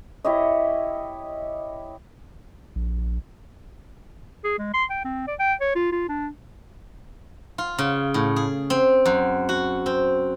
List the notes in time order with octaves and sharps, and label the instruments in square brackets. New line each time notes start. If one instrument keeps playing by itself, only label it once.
[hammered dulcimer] E4 G4 C#5 D#5
[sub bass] A#1
[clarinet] G#4
G#3
C6
G5
C4
D5
G5
C#5
F4
F4
D4
[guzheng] F4
C#3
A2
G#4
C4
F#2
F#4
C4